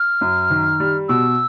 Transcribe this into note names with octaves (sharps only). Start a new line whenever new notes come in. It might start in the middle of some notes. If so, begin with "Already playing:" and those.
Already playing: F6
F#2
D#3
G3
B2 E6